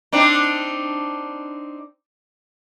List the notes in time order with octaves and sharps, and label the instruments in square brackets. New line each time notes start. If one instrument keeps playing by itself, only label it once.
[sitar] C4 D4 D#4